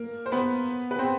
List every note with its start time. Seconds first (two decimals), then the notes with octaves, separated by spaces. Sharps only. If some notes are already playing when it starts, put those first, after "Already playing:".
Already playing: A#3 A#4
0.26 C5
0.32 B3 B4
0.91 B4
0.99 C4 C5